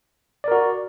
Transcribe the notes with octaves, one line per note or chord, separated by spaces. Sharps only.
F#4 A#4 D5